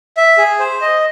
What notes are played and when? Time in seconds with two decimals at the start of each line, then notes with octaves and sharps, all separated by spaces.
0.17 E5
0.38 G#4
0.59 C5
0.81 D#5